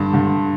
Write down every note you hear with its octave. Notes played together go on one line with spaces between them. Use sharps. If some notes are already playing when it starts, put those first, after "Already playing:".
Already playing: G2 D3 A5
G2 D3